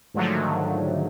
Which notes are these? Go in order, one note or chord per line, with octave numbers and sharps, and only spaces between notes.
G#2 D3 D#3 F3 F#3 A3